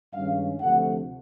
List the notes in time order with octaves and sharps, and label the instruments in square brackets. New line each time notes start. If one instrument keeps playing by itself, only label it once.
[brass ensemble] G2 D#3 G#3 C#4 F5
D2 C3 F3 A3 F#5